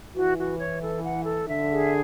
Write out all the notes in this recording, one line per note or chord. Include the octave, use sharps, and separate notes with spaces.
E3 F#4
F#4
C#5
A4
F#5
A4
D3 E5
G#4